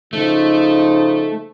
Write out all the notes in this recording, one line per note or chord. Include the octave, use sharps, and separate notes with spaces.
C#3 F3 A3 D#4